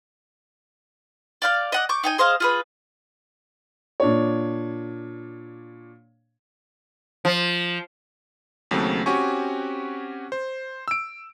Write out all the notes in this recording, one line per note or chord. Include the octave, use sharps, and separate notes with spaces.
D5 F5 G6
D#5 F#5 D6
C#6 D6 G6
D#4 G5 G#5
G#4 C5 D#5 F5
F4 G#4 B4
A#2 D4 C#5
F3
D#2 C#3 F#3 A3 C4
C4 C#4 F#4 G4 G#5 C#6
C5
E6 D7